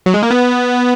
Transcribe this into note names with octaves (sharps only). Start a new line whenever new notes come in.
F#3
G#3
A#3
B3